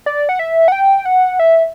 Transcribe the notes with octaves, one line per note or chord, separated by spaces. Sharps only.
D5
F#5
E5
F#5
G5
F#5
E5